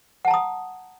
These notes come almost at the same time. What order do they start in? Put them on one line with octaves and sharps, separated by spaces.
F#5 A5 A#5 D#6